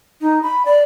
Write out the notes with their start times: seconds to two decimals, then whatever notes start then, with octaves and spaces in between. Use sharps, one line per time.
0.21 D#4
0.43 B5
0.65 D5